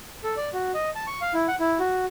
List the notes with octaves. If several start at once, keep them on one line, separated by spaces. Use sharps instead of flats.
A4
D5
F#4
D#5
A5
C#6
F5
E4
F#5
E4
F#4